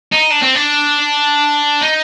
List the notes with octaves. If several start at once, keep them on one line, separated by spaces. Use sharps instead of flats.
D#4
D4
C4
D4
D#4